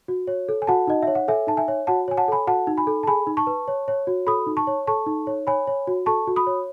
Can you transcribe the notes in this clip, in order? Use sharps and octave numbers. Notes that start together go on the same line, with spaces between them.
F#4
C#5
A4
G#5
F#4 F#5 A5
D#4 D#5
C#5 E5
F#5
A4 E5 G#5
D#4 A5
E5 G#5
C#5
F#4 F#5 A5
C#5 G#5
F#5 A5
A4 G#5 B5
F#4 F#5 A5
D#4
G#5 B5
A4
A5
G#4 G#5 B5
D#4
A5 C#6
B4
C#5
C#5
F#4
A4 B5 D#6
D#4
A5 C#6
C#5
A4 A5 C#6
D#4
C#5
C#5 G#5 B5
C#5
F#4
A4 A5 C#6
F#4
B5 D#6
C#5